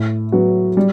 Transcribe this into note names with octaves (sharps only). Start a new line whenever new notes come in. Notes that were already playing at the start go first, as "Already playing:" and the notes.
Already playing: A2
F#3 B3 F#4
G3